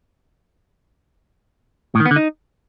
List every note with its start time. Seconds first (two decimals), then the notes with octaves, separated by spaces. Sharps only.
1.95 A2
2.00 D#3
2.06 B3
2.11 D3
2.16 D#4